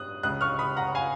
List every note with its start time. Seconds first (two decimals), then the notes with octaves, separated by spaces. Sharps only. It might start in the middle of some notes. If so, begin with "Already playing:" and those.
Already playing: D#6 F#6
0.23 C#2 C#3 D#6 F#6
0.41 C#6 F6
0.59 B5 D#6
0.77 F#5 A#5
0.95 F5 G#5